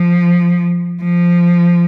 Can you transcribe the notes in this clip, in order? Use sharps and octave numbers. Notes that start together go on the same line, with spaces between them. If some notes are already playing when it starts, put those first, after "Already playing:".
Already playing: F3
F3